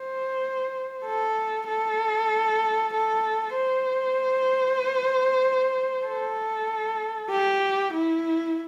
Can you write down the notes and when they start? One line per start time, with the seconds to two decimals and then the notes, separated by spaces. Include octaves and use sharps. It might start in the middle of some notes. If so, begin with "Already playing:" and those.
Already playing: C5
1.05 A4
1.68 A4
2.93 A4
3.55 C5
6.06 A4
7.30 G4
7.93 E4